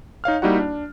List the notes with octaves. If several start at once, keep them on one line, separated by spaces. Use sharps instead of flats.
D#4 C#5 F5 F6
G3 A#3 D#4 E4 F#4 F#5
D4